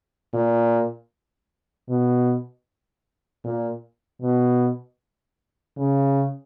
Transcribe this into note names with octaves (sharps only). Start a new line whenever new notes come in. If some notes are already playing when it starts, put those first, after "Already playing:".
A#2
B2
A#2
B2
C#3